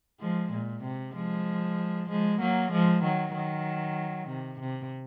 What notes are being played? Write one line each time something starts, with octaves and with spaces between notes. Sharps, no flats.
F3 G#3
A#2
C3
F3 G#3
F3 G#3
F#3 A#3
F3 G#3
D#3 F#3
D#3 F#3
C3
C3